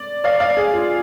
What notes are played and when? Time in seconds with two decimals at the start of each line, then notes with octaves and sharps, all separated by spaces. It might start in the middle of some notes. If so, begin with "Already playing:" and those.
Already playing: D5
0.24 D5 F5
0.40 D5 F5
0.57 G#4
0.73 F4